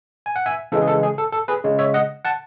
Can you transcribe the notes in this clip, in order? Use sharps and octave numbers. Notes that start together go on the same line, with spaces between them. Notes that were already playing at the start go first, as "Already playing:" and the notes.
G#5
F#5
E5 G#5
C#3 E3 G#3 A4
G#4
A4
G#4
A4
A4
G#4 B4
C#3 G#3
C#5 E5
D#5 F#5
F#5 A5